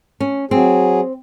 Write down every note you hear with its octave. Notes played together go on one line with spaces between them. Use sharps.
C#4
F#3 C4 G#4